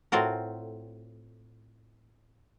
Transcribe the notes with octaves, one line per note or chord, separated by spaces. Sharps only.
A2 C4 F4 F#4 A#4